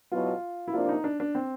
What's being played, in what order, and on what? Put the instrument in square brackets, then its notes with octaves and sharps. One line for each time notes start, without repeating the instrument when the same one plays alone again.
[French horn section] E2 B2 F#3 [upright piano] F4
[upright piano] E4
[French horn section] C3 F3 A#3 D4 [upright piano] F4
[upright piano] D#4
D4
D4
C4